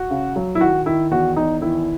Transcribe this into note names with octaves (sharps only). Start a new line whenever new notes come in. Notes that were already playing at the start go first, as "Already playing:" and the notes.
Already playing: F#4
C#3
F#3
E4
D#3 F#4
D#3 E4
E2 F#4
E2 D#4
D#3 E4